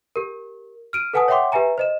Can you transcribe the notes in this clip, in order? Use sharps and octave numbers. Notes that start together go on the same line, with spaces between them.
G4 A#4
F6 D7 D#7
A4 B4 F#5 G#5 A5 D#6
C#5 E5 F#5 G5 C6 D6
G4 B4 E5 G#5 A#5
C5 D#5 E7